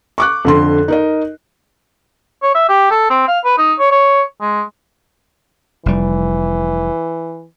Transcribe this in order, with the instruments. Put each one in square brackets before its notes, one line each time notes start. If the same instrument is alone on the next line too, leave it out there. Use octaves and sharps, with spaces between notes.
[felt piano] C#6 D6 F#6
F2 D3 C6
D#4 A#4 D#5
[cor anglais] C#5
E5
G4
A4
C4
F5
B4
D#4
C#5
C#5
G#3
[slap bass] F1 G3 [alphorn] E3